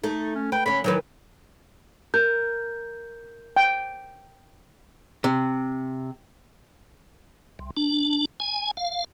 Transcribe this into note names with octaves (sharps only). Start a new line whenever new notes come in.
A3 D#4
C#4
B4 G5
D3 C#4 B5
D#3 E3 F#3 B4
A#4 G6
G5
C3
C2
D4
G#5
F5